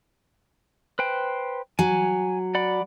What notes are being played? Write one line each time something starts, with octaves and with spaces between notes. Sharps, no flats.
B4 C5 G5
F#3 G#5
D5 F#5 B5